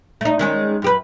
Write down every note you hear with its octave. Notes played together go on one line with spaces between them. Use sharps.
A3 D#4
D#3 G#3 C#4
F#2 G4 B4